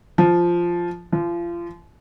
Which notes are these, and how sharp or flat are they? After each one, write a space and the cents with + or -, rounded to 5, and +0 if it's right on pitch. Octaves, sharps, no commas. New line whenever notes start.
F3 -10
F3 -35